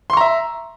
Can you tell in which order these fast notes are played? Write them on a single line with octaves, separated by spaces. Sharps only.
C6 C#6 A#5 E5